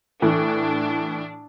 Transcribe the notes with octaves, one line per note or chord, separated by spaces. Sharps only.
A2 E3 D4